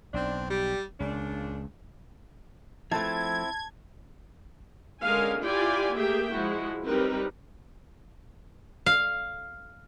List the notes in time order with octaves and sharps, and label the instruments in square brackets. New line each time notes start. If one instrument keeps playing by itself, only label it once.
[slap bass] B1 [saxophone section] C4 D4
[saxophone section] G3 G4
[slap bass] C#2 [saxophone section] A#2 C#3 D4
[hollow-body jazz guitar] F3 A3 [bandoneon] C4 E4 [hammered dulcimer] A5 [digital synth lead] G#6
[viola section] D3 G#3 C#4 A#4 F5 G#5
E4 F4 G4 D5 G5 G#5
A3 A#3 G4 G#4 E5 G5
F3 G#3 E4 F#4
G3 C4 D#4 A#4 B4
[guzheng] F5